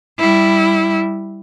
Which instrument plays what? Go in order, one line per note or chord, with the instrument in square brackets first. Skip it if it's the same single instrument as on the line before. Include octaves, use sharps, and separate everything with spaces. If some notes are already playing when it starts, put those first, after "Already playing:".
[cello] G3 E4